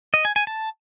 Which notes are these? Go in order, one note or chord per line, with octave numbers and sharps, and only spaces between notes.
D#5
G#5
G#5
A5